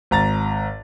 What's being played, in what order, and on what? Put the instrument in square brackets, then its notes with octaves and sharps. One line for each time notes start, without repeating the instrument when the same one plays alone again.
[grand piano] G#1 A#5 A6